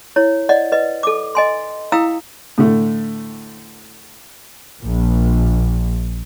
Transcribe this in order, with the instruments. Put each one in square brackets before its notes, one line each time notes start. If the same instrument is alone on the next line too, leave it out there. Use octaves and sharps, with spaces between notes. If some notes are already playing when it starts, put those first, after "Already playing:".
[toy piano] E4 C#5
D5 D#5 F#5
B4 D#5
A4 D6
D#5 G#5 C6
E4 F5 G5 A#5 D#6 E6
[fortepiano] A2 D3 A3
[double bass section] A#1